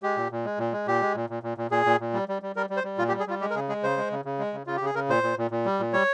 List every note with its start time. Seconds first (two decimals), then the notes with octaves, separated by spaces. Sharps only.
0.03 G#3 G4
0.17 A#2
0.32 A#2
0.45 G#3
0.59 A#2
0.73 G#3
0.87 A#2 G4
1.01 G#3
1.15 A#2
1.30 A#2
1.43 A#2
1.58 A#2
1.71 A#2 G#4
1.86 A#2
2.00 A#2
2.14 G3
2.28 G3
2.42 G3
2.56 G3 A#4
2.70 G3
2.77 C5
2.84 G3
2.98 A#2 F4
3.08 G4
3.12 G3
3.20 G#4
3.27 G3 F4
3.41 G#3 G4
3.50 A#4
3.55 C#3 G#4
3.69 G#3 G#4
3.83 C#3 C5
3.97 G#3
4.11 C#3
4.25 C#3
4.39 G#3
4.53 C#3
4.67 C#3 F4
4.76 G4
4.81 C#3 G#4
4.95 C#3 A#4
5.09 A#2 C5
5.23 A#2
5.38 A#2
5.51 A#2
5.66 G3
5.80 A#2
5.93 G3 C#5